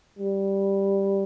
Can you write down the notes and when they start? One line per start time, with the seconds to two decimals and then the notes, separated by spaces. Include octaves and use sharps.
0.19 G3